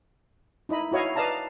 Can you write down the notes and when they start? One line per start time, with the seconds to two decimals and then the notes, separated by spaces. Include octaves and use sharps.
0.69 D#4 E4 D#5 B5
0.92 E4 F#4 C#5 D#5 F5
1.16 B4 D5 D#5 F5 A5 A#5